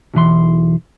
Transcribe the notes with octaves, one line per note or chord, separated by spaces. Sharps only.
B1 E2 E3 C6